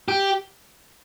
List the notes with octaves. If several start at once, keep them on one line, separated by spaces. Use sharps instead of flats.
G4